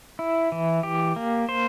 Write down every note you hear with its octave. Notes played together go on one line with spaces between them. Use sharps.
E4
E3
G4
A#3
C5